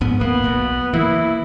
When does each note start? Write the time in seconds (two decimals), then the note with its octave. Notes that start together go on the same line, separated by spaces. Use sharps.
0.01 A#1 G#2 B3
0.20 D#1 A#3 B3
0.44 B1 B2
0.94 E3 A#3 E4